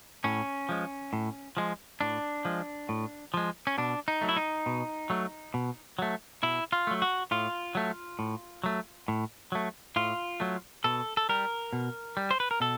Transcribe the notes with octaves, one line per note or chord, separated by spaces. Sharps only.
A2 C#4
F3 G#3
A2
F3 G#3
A2 D4
F3 G#3
A2
F3 G#3
C#4
B2 D4
D#4
F#3 A3
E4
D#4
B2
F#3 A3
B2
F#3 A3
B2 E4
F4
F#3 A3
F#4
A2 F4
F#3 A3
A2
F#3 A3
A2
F#3 A3
A2 F4
F#3 A3
B2 A4
A4
G3 A#4
B2
G3
C5
B4
A#4
B2 A4